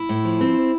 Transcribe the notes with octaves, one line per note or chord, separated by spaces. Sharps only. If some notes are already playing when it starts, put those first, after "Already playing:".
Already playing: E4
A2
F3
C4